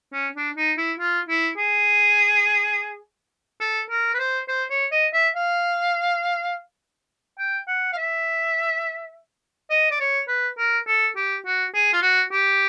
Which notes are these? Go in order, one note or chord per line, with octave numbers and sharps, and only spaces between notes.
C#4
D4
D#4
E4
F4
E4
G#4
A4
A#4
B4
C5
C5
C#5
D#5
E5
F5
G5
F#5
F5
E5
D#5
D5
C#5
B4
A#4
A4
G4
F#4
G#4
F4
F#4
G4